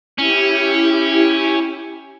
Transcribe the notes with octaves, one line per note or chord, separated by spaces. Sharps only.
C#4 E4 G4